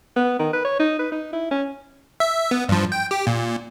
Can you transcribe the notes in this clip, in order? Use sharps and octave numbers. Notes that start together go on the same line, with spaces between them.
B3
D#3
B4
C#5
D#4
B4
D#4
E4
C#4
E5
B3
G2 F3
G5
G4
A#2